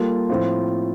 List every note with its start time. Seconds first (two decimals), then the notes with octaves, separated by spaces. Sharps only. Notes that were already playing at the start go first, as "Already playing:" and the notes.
Already playing: G3 A#3 F4 A4
0.29 A2 F3 C4 F4